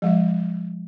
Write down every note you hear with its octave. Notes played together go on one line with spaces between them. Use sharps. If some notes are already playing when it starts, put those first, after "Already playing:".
F3 G#3 E5